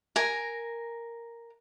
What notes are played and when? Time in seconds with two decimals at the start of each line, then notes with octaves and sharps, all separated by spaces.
0.16 A#4 G#5 A#5